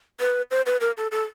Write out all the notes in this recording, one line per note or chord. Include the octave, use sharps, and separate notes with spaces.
B4
C5
B4
A#4
A4
A4